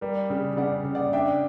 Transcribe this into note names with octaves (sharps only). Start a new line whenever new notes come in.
G3 A#4
C#3 G4
C#3 D5 F#5
C#3
D5 F#5
D4 E5 G5